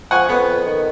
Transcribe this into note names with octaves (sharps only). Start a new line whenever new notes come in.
F3 F#5 G#5 C#6
F2 B3
D#3